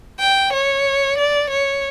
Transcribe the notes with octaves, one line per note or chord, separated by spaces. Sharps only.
G5
C#5
D5
C#5